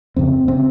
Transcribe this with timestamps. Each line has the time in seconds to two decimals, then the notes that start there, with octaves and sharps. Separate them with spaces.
0.16 F2 C#3 C4
0.48 C#3 C4